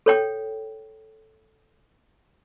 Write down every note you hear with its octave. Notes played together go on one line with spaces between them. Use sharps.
A4 C#5 G5